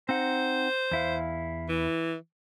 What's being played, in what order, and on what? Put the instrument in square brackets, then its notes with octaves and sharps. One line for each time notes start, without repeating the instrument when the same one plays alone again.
[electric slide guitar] C4 D#4 F#5 [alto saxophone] C5
[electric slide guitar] E2 E4 F5
[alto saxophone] E3